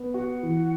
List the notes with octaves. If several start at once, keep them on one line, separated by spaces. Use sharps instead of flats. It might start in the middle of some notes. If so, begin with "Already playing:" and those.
Already playing: B3
F#4 F#5
E3